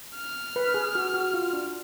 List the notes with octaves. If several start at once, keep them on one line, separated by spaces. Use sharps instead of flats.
F6
B4
G#4
F#4
F#4
F4
D4